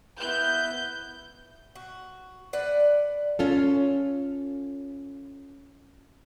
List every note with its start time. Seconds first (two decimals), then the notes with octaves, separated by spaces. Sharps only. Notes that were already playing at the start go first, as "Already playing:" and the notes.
0.20 B3 E4 B4 G6
1.75 F#4
2.53 B4 D5 F#5
3.39 C#4 F4 A4